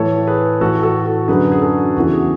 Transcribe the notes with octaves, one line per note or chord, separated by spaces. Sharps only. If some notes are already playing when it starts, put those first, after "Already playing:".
Already playing: A2 E3 A4 C#5
G#4 B4
A2 E3 F#4 A4
F#4 A4
F#4 A4
F#2 D3 G#4 B4
G#4
F#4 A4
E2 C#3 E3 F#4
G#4